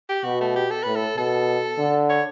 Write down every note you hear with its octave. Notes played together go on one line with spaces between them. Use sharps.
G4
B2 F#4
A3
G4
A4
A2 B4
A4
B2 A4
D3
C#5